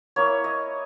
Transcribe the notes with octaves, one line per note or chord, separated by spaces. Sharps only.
A#3 E4 C#5
D#5